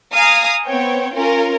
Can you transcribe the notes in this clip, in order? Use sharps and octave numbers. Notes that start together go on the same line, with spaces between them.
F5 G#5 A#5 D#6 F6
B3 C4 C#5 G5
C#4 F4 A#4